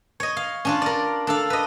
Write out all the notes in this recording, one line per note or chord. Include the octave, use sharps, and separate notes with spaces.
C#5 D#5
F5
C#4 D4 F4
A#4 D5
D4 A4 F5
B4 D#5